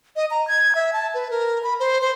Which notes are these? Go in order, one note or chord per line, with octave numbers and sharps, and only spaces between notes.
D#5
A#5
G#6
E5
A5
B4
A#4
B5
C5
C5